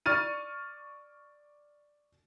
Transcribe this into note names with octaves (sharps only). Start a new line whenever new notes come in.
D5 C#6 F6 A6 D#7